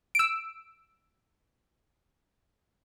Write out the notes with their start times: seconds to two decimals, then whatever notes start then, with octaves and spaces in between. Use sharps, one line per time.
0.15 E6 D7